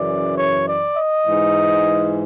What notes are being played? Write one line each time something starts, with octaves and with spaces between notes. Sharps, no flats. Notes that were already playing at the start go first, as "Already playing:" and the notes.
Already playing: F#2 C#3 E3 D5
C#5
D5
D#5
G#2 E3